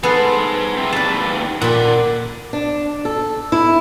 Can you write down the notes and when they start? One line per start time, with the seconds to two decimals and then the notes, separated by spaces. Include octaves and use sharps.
0.03 B3 G#4 A4 B4 C5
0.77 C4 E4
0.92 D#2 B4 D5 A5
1.61 A#2 D5 F#5 B5
2.53 D4
3.05 A4
3.52 E4